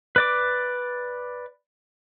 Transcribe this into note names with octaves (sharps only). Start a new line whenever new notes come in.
B4 D5 D6